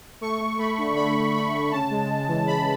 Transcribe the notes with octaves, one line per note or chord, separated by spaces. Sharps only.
A3 C#6
A3
A3 B5
D3
D3 B5
D3
A3 B5
D3
C#3 A5
G#3
G#3
E3
C#3 B5